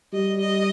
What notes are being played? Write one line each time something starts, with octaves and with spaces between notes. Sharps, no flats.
G3 D#5
D#5